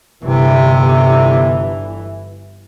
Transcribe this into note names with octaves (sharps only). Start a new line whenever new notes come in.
G1 C3 E3